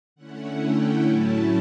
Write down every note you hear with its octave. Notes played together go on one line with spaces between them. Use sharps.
D3 A3 C#4 E4 F#5
G5
A2 F#3 A3 C#4 E4 A5